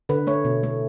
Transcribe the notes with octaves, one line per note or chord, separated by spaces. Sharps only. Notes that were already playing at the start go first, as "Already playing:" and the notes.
D3 B4
A3 C#5
B2
A3